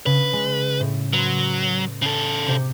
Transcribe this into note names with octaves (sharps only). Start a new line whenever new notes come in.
C#3 B4
G#3
A2
F#3 B4 C6
C#3 A4
C3 G4